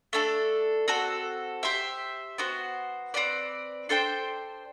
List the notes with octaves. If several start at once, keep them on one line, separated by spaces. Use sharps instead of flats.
A3 D4 A4
C4 F#4 A4
G4 C5 E5
B3 F#4 C5
C4 F#4 B4 D5
D4 A4 C5 G5